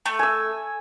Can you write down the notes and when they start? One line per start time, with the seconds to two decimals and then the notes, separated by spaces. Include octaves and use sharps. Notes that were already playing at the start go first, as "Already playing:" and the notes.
0.06 A3
0.19 G#5 E6